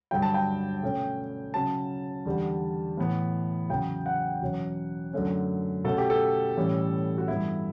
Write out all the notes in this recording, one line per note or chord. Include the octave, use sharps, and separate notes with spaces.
G2 D3 F#3 G5
A5
G5
B2 A3 C#4
C#3 F#3 C#4 A5
E2 D3 G3
A2 E3 B3
E2 C#3 F#3 G5
F#5
E2 B2 F#3 C#4
F#2 D3 A3 C#4
B2 A3 C#4 A4
G4
A4
A2 E3 G3 C#4
F#4
G2 E3 B3 E4